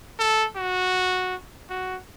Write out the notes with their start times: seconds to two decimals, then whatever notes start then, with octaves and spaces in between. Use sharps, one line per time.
0.19 A4
0.56 F#4
1.69 F#4